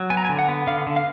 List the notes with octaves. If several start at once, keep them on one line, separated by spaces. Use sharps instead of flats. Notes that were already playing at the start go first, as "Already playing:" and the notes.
Already playing: F#3
B3 G#5
A#5
G#5
D3
F#5
B3
D3 F5
D3
F5